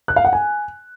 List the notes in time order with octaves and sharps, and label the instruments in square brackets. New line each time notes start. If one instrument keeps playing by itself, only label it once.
[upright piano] F#6
F5
F#5
G#5